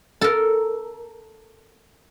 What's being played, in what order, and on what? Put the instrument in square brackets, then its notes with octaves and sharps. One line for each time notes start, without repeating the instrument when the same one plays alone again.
[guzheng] A4 A#4